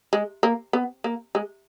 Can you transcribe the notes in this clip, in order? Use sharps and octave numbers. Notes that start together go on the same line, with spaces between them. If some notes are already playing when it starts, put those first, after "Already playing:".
G#3
A#3
B3
A#3
G#3